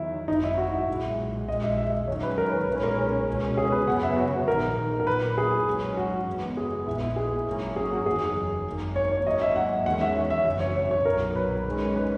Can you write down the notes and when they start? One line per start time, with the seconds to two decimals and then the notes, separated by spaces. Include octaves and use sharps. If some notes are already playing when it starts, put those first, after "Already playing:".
Already playing: E2 D#3 F#3 E4
0.28 G#1 F#2 D#3 D#4
0.44 E4
0.58 F#4
0.73 E5
0.88 B1 A#2 G#3
1.48 A#1 A#2 G#3 D#5
1.62 E5
1.78 E5
1.88 E5
2.08 G#2 D#3 F#3 C#4 C#5
2.23 B4
2.38 A#4
2.52 B4
2.67 B1 A#2 G#3 C#4 B4
2.83 A#4
3.28 C#2 B2 G#3 C#4
3.57 G#4
3.72 B4
3.87 F#2 C#3 F#3 B3 F#5
4.03 E5
4.17 F#4
4.47 A#1 G#2 D#3 A#4
5.00 A#4
5.07 B1 A#2 A#3 B4
5.38 G#4
5.66 G#2 F#3 C#4
5.97 F#4
6.28 F#1 F#2 E3 G#3 B3
6.57 G#4
6.86 A#1 A#2 G#3 B3 E4
7.01 E4
7.16 G#4
7.46 G#1 G#2 F#3 A#3 C#4
7.76 G#4
7.92 F#4
8.06 F#1 E2 D#3 F#3 G#4
8.66 G#1 F#2 D#3 A#3
8.96 C#5
9.12 C#5
9.26 G#2 F#3 A#3 C#4 D#5
9.42 E5
9.56 F#5
9.86 E2 D#3 G#3 C#4 F#5
10.01 E5
10.16 E5
10.30 E5
10.46 G#1 F#2 C#3 E3 E5
10.60 C#5
10.76 C#5
10.91 C#5
11.05 B1 A#2 F#3 A#4
11.36 B4
11.66 G#2 D#3 G#3 C#4
11.96 B4